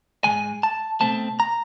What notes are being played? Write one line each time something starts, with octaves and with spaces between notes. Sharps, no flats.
G#2 E3 G#3 G#5
A5
B2 F#3 A3 C4 A5
A#5